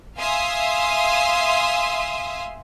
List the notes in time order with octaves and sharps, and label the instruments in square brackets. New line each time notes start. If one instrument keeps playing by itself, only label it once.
[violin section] E5 F5 G#5 C6 D#6